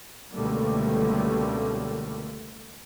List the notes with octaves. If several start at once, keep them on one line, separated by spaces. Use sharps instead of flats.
C#2 B2 D3 G3 A3 A#3